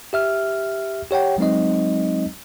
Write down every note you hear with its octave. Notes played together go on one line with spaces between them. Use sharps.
G4 E5 F6
G4 C#5 F#5 G5
F#3 G#3 C4 D#4 D#5